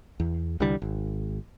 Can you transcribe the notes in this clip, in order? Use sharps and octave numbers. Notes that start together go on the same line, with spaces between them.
E2
C2 D3 E3 G3
G#1